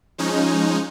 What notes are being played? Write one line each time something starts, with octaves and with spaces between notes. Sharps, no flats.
F3 G#3 C#4 D#4